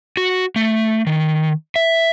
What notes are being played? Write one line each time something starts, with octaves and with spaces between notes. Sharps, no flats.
F#4
A3
D#3
E5